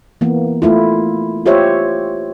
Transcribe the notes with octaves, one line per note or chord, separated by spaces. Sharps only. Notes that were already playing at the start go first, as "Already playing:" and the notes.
E3 A#3 B3
A3 E4 F4
F4 G4 C5 C#5 E5